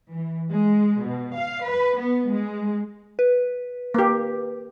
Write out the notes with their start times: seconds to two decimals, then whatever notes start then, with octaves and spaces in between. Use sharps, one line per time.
0.12 E3
0.51 G#3
1.03 B2
1.36 F5
1.65 B4
1.98 B3
2.29 G#3
3.19 B4
3.94 A#3 G4